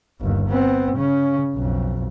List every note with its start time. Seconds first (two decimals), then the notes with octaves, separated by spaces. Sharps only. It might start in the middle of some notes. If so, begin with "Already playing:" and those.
0.20 G1 D#2
0.49 B3 C4
0.97 C#3 C#4
1.55 B1 F2